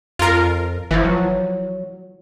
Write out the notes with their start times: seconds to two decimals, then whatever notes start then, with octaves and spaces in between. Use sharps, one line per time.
0.19 F2 F4 A#4
0.91 G1 E3 F3
1.05 F#3